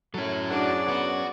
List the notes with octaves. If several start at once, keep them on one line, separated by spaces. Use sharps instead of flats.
F#3 C#4 E4 A4
D4 F#4 G#4 D5
B3 F#4